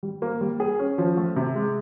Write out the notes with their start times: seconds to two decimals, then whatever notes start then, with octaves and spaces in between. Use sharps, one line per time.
0.03 G3
0.22 A#3
0.41 G3
0.60 G#4
0.79 C#4
0.98 F3
1.17 A3
1.36 C3
1.55 G#3